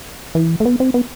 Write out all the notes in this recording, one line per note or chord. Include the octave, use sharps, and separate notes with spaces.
E3
A3
B3
C4
B3